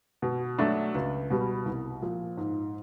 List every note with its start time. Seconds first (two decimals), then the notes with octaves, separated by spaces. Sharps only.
0.22 B2
0.58 F#3 A3 D4 F#4
0.95 C#2
1.30 B2 G3 B3
1.66 C2
2.02 A#2 F3
2.37 G#2